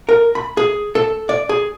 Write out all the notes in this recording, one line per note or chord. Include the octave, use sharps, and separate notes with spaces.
A#4
B5
G#4
A4
D5
G#4